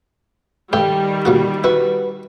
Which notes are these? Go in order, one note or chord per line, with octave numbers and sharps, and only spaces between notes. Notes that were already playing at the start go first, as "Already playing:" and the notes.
G2 D#3 G3 A3 G4
D2 A#2 F#4
E4 F#4 B4